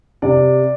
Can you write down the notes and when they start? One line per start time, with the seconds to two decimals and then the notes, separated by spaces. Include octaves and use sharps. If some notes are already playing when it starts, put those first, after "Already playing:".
0.22 C3 D5